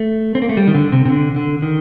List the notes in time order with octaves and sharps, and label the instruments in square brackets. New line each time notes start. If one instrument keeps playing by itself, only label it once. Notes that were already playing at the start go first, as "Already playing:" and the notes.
Already playing: [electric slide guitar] A3
C4
A#3
A3
G3
D#3
D3
C3
C3
D3
D3
D#3